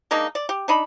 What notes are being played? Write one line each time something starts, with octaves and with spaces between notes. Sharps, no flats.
G#3 A#3 D4 D#4
D5
G4
D4 D#4 B5